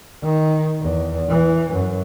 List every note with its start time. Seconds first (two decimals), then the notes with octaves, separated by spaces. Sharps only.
0.23 D#3
0.82 E2
1.28 E3
1.73 F#2